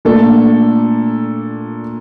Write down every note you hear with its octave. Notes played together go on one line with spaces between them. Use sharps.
A#2 A3 D4 A4